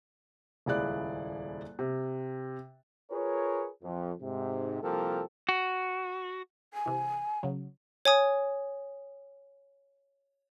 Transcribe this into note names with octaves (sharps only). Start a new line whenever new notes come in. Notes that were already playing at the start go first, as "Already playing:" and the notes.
D#1 C#2 E4 G#4 D5 F#6
C3
F4 G#4 A#4 B4 C#5
F2
G#2 C3
C2 F3 A#3 G4 A4 A#4
F#4
G#5
C3 E3
C#3 F#3
C#5 G#5 D#6